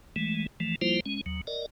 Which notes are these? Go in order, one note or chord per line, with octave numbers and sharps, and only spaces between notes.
E3 G#3 A3
E3 F3 A3
F3 G3 A#3 E4 F4 C5
G#3 C#4
D#2 F#3
A#4 D5 D#5